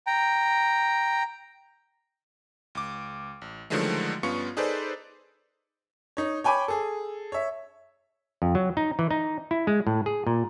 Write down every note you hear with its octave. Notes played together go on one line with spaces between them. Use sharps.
G5 A#5
C#2 D6
A1
D3 D#3 F3 F#3 G#3 A3
G2 B3 C#4 F4 C#6 C#7
D#4 G#4 A4 B4 C5 D5
D#4 C#5
C#5 G5 G#5 B5 D6
G#4 A4
C#5 E5
F2
F#3
D#4
E3
D#4
E4
G#3
A2
G#4
A#2